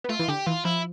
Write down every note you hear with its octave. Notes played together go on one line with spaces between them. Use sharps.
B3
A3 F4
E3
D3 G4
E3 F4
F3 E4